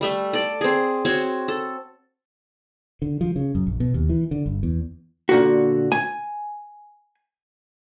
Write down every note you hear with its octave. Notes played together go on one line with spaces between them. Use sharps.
G3 A3 E5
A4 D5
C4 G#4
C4 F#4 C#5
A4
D3
F3
C#3
F#2
A#1
B2
D#2
E3
D3
G1
E2
A#2 D3 F#4
G#5